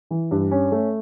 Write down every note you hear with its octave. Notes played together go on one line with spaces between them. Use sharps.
E3
G2
C#4
A3